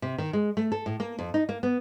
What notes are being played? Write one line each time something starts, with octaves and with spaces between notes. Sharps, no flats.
C3
D#3
G#3
A3
A4
A2
A#3
F2
D#4
A#3
B3